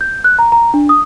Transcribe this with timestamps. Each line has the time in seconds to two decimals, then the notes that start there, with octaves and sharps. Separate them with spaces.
0.01 G6
0.24 F#6
0.39 A#5
0.52 A#5
0.74 D4
0.89 D#6